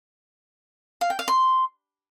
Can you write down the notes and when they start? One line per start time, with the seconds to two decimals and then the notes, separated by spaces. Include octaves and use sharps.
1.01 F5
1.10 G5
1.19 F5
1.28 C6